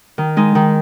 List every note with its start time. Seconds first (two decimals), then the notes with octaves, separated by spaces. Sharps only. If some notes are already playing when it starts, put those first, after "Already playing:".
0.18 D#3
0.37 G#3 D#4
0.55 D#3